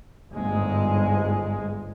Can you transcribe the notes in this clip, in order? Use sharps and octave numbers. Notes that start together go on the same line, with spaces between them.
G1 G#2 G#3